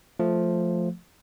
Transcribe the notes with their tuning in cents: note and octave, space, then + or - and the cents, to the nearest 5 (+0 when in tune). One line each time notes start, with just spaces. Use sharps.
F3 +5 A3 +0